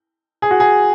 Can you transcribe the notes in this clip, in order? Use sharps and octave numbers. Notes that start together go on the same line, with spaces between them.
G#4
F#4
G#4